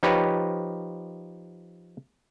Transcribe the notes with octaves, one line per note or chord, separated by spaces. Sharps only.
F3 D#4 G4 B4 C#5